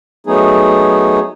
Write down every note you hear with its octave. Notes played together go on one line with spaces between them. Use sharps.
F#3 A3 B3 D#4 G#4